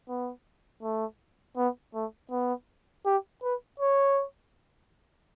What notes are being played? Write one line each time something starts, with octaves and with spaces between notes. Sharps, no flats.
B3
A3
B3
A3
B3
G4
B4
C#5